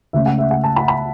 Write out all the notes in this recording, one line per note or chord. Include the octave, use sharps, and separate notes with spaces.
C#2 C#3 A3 C#4 E5
F#5
E5
F#5
A5
B5
B5